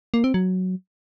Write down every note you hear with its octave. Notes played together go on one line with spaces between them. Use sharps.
A#3
C4
F#3